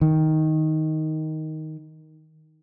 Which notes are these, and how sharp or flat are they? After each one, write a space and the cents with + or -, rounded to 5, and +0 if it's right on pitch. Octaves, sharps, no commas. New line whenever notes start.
D#3 +5